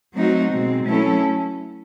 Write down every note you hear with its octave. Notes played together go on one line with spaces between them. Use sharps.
F#3 A3 C4 D#4 F#4
B2 G#3 C4
F#3 A3 C#4 E4 A4